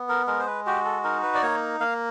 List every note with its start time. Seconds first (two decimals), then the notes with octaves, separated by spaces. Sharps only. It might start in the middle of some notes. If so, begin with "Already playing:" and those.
Already playing: B3
0.09 A#4
0.27 G#3 A#4
0.39 C5
0.47 B4
0.66 F#4 G4
0.85 A4
1.04 D#4 A#4
1.23 B4
1.35 D5
1.43 A#3 C#5
1.80 A#3 F5